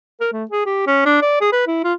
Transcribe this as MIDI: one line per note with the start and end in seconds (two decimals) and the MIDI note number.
0.21 0.28 70
0.32 0.45 57
0.51 0.63 68
0.66 0.83 67
0.87 1.02 61
1.06 1.21 62
1.22 1.36 74
1.41 1.50 68
1.53 1.66 71
1.67 1.81 64
1.84 1.93 65